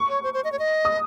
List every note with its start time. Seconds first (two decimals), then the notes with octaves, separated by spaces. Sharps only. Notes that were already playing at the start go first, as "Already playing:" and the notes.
Already playing: C#6
0.09 C#5
0.23 C5
0.34 C5
0.44 D#5
0.52 C#5
0.59 D#5
0.85 D#6